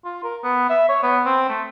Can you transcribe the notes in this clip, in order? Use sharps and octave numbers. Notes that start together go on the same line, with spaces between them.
F4
A#4
B3
E5
C#5
B3
C4
A3